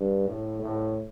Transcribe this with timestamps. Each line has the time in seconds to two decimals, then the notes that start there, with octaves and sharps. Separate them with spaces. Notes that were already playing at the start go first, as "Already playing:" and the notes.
Already playing: G2
0.28 A2
0.62 A2